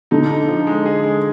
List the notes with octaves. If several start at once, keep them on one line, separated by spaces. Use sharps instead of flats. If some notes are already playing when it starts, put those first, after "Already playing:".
D3 D#4
D#4
F3
G#3
G#4
G#3